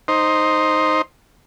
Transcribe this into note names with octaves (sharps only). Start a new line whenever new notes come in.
D#4 C5